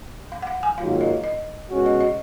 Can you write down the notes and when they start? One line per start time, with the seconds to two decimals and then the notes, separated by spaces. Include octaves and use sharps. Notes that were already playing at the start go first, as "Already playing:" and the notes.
0.32 F5
0.42 F#5
0.47 F5
0.63 G#5
0.78 G#2 D#3 F#3 A#3 F4 F5
1.01 D#5
1.24 D#5
1.70 B2 G#3 C#4 F#4
1.86 D#5
2.01 D#5